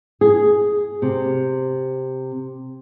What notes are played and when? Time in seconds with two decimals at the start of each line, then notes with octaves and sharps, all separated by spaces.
0.21 G#4
1.02 C3